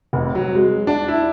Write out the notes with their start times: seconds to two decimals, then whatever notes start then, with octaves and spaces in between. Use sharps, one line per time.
0.13 F1
0.35 F#3
0.55 G#3
0.87 D4
1.08 E4